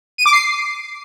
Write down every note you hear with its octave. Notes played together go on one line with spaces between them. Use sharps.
D#7
D6
C7